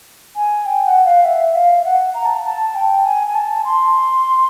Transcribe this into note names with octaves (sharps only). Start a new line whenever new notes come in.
G#5
G5
F#5
F5
E5
F5
F#5
A#5
A5
A5
G5
G#5
G#5
A5
C6